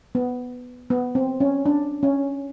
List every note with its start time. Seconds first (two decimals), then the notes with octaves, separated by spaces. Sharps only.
0.15 B3
0.90 B3
1.15 C4
1.40 C#4
1.66 D4
2.03 C#4